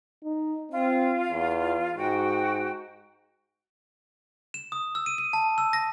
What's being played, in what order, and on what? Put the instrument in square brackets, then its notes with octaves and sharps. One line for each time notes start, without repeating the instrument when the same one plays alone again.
[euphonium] D#4
[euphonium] C4 [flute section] F4
[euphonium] E2
[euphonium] G#2 [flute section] F#4 G5
[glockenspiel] E7
D#6
E6
D#7
D#7
A5
E6
A#6